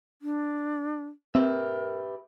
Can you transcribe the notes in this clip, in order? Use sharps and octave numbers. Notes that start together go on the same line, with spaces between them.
D4
C4 G4 A#4 B4 E5